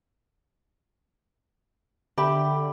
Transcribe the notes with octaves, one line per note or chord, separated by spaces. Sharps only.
D3 G4 E5 B5